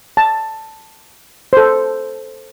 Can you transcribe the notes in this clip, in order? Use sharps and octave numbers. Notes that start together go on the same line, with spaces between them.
A5
A4 C5